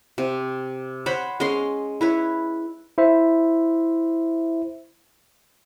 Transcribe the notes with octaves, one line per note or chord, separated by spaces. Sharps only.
C3
C5 C#5 F#5 B5
G#3 C#4 D#5 C6
E4 B4 C#5
E4 C5 E5